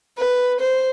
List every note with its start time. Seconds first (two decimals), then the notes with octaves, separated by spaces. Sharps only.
0.17 B4
0.60 C5